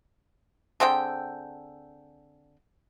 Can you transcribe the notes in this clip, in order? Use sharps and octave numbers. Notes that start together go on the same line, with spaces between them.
D3 C4 G#4 G5